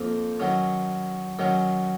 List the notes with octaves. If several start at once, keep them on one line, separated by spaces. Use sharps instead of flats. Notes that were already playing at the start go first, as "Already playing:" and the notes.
Already playing: F2 F3 A#3
D#3 F#3 C#4
D#3 F#3 C#4